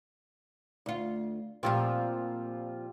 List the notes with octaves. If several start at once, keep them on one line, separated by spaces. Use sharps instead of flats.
D2 F4
A#2 F3 G3 C4 F4 E6